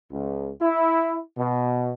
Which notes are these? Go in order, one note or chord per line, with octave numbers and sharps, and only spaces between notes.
C#2
E4
B2